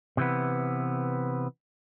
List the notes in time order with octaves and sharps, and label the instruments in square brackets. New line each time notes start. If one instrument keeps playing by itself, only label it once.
[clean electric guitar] C3 E3 B3